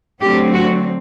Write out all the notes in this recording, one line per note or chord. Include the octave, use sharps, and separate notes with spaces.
D3 F#3 A3 C4 G4
F#4